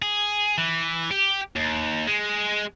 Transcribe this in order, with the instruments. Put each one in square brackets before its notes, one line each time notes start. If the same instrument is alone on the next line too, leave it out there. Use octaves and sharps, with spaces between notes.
[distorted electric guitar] G#4
E3
G4
D#2
G#3